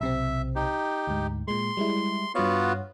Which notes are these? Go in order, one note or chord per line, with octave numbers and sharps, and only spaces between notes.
B1 C3 C4 E5
D#4 G4
D2 G#2
A#2 G#3 C6
G3 G#3 E4
G2 B3 F4 F#4 C#5